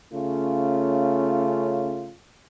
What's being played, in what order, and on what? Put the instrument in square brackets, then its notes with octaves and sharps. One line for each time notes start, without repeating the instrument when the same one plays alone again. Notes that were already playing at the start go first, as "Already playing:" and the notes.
[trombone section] C#3 A3 C#4 F4